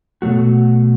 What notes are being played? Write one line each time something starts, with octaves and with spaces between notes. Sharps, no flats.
B2 F#3 A3 F#4